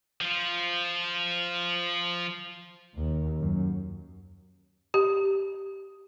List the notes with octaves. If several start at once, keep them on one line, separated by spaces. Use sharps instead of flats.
F3 F4
D#2
F#2
G4